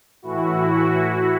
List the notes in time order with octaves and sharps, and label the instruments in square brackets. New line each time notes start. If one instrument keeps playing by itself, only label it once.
[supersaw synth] A2 E3 E4 F#4